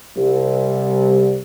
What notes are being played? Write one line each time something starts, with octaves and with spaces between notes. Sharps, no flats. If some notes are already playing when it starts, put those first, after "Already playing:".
C2